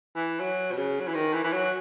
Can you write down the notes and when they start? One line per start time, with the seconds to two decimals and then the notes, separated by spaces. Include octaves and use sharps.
0.15 E3
0.40 F#3
0.72 B2
0.77 C#3
1.00 F#3
1.07 E3
1.15 D#3
1.33 E3
1.44 E3
1.53 F#3